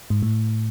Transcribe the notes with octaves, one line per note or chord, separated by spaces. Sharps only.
G#2
A2